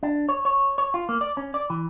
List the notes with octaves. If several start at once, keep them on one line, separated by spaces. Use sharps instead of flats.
D4
C#5
C#5
C#5
F4
A#3
D5
C#4
D5
E3